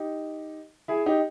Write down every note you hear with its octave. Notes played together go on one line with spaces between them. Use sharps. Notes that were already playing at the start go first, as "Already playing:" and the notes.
Already playing: D#4 G4
E4 G#4
D#4 G4